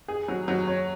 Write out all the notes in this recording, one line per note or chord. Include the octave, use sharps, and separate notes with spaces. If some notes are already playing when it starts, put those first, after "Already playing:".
G#4
F#3
F#3
C#4